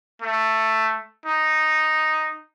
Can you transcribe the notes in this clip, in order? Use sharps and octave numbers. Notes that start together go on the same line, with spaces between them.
A3
D#4